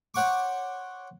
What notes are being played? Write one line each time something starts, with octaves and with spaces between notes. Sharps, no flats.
C5 C#5 F#5 C#6 D6